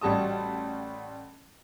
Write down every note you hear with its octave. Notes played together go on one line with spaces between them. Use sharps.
A1 G3 F#4 A5 D#6